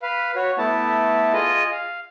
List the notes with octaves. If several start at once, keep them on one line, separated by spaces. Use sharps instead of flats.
B4 F5
F#4 C#5
A3 B3 E4 A5
F4 G#4 D#5
F5